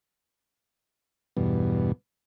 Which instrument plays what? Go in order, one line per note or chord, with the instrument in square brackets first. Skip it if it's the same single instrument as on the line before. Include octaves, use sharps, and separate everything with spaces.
[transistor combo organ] E2 G2 B2